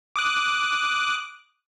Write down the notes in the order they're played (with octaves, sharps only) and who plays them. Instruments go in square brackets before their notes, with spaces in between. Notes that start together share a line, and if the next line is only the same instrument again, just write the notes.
[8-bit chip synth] D6 D#6 F#6